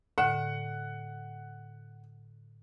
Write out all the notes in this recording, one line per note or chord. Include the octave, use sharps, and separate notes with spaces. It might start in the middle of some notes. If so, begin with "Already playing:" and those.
A2 D3 F#5